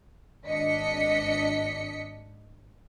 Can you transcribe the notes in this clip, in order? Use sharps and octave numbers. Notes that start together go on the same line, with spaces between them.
G#1 D4 D#5 B6 C#7